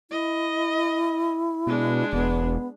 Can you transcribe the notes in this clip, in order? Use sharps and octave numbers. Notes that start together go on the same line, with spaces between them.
E4 D#5
B2 G#3 D4
E1 B3